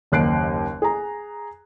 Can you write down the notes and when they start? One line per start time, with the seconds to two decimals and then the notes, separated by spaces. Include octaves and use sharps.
0.12 F#1 D#2 F#6 C7 D7
0.82 G#4 A#5